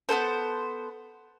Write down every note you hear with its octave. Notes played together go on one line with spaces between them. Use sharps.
B3 C4 A4 C5